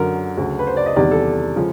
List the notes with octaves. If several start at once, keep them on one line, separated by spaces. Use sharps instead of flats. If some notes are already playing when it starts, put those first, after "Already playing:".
Already playing: F#2 D3 F#3 A#4
D2 C#3 F#3
B4
C5
D5
D#5
E2 C3 D#3 G3 D5
A4
C#3 F3 G#3